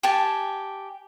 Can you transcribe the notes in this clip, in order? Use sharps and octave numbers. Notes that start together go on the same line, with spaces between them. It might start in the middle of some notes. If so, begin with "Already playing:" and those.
G4 G#5 A5